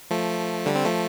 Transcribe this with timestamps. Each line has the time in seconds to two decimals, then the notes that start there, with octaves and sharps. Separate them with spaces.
0.11 F3 A3
0.66 D3 G3
0.75 C4
0.85 F3 A3